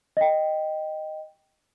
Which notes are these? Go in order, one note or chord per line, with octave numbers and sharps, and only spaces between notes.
D#5 G5